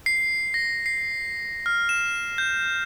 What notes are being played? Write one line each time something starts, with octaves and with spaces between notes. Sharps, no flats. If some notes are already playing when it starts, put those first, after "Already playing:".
C7
A#6
C7
F6
E7
G6